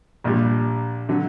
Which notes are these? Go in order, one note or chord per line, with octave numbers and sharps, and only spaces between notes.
A#1 A#2 G3
D3 F#3